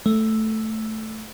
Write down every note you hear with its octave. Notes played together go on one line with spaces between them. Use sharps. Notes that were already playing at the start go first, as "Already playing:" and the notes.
A3